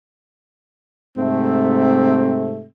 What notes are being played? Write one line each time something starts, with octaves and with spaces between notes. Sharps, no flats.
G#2 C3 A3 C4